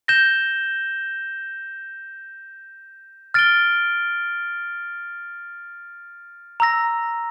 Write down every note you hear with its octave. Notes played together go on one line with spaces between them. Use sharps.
G6 A#6 E7 G7
F6 A6 D7 G7
A#5 E6 A#6